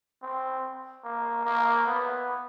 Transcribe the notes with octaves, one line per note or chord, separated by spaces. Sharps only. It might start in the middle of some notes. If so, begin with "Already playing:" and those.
C4
A#3
A#3
B3